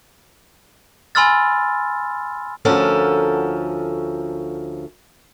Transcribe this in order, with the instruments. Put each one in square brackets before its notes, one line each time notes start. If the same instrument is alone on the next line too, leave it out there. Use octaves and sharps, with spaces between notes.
[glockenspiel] G#5 B5 C6 E6 F6 A6
[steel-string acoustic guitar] D2 F3 C#4 A4 A#4 F#5